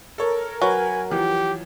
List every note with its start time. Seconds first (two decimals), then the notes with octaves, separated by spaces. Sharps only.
0.18 A4 A#4 C#5
0.62 F#3 B4 C#5 G#5
1.11 E3 F3 G4